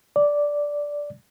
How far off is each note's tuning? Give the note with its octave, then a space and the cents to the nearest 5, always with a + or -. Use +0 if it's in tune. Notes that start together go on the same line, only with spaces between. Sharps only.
D5 -5